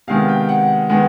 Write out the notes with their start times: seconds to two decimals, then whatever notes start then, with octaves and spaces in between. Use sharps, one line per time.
0.08 C3 D#3 G#3 B3 F5
0.29 G5
0.49 F#5
0.89 D#3 G#3 B3